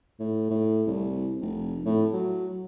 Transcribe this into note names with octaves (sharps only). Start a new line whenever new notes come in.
A2
A2
C2
F1
A2
F#3